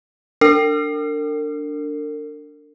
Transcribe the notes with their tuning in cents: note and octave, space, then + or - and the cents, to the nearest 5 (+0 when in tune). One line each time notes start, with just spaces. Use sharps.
D4 +0 A#4 -40